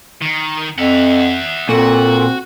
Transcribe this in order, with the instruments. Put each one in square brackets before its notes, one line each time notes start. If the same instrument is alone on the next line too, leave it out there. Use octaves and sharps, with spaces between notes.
[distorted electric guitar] D#3
[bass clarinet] F2 [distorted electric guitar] E5 F#5
[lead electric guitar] A#2 [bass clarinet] C4 [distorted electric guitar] F#4 [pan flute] A4